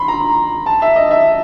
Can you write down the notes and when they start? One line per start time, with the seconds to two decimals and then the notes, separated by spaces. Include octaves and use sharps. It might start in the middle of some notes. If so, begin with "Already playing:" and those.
Already playing: B5 C6
0.08 A#5
0.66 A5
0.82 E5
0.96 D#5
1.11 E5